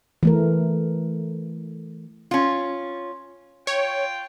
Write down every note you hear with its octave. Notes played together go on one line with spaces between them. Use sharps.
E3 A3 A#4
C#4 F4
F4 C#5 G5